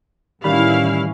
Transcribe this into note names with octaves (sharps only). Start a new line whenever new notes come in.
A2 D#3 E3 G3 C#4 E4 F5 B5